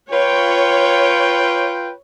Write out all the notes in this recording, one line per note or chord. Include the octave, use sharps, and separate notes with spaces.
F4 B4 C#5 G5